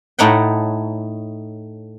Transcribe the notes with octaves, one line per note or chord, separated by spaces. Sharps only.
A2 A3 D#4 C#5 F#5 G5